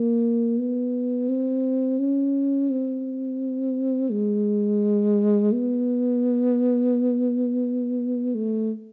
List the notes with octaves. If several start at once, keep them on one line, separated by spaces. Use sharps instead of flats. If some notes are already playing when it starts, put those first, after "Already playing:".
Already playing: A#3
B3
C4
C#4
C4
G#3
B3
A3